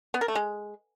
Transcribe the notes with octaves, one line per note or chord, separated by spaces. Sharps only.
B3
A#4
A3
G#3